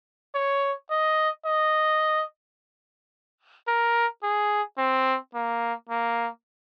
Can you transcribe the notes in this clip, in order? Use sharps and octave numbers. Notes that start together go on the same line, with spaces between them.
C#5
D#5
D#5
A#4
G#4
C4
A#3
A#3